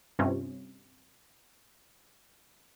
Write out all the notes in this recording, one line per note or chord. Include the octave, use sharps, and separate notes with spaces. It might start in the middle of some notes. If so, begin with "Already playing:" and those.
G2 C3 C#4 F4